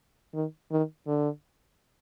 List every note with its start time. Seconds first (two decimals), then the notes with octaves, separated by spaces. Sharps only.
0.34 D#3
0.71 D#3
1.07 D3